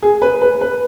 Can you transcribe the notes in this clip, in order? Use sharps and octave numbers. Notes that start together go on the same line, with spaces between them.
G#4
B4
B4
B4